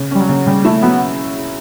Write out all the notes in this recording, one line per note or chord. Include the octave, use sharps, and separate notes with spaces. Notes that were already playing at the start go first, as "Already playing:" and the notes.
Already playing: C#3
G3 C#4
F#3
C#3
C#3 G3
A3 E4
F#3 B3